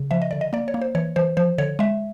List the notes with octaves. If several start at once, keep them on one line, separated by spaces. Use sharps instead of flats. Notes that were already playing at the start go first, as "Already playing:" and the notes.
Already playing: C#3
F3 E5
D#5
D3 D5
D#5
A#3 D5
C#5
A#3
C5
E3 C#5
E3 C5
F3 C5
D3 C#5
G#3 E5